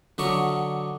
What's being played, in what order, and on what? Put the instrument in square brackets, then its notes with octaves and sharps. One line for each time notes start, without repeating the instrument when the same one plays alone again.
[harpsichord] D3 F#3 D4 D#5 E5 C#6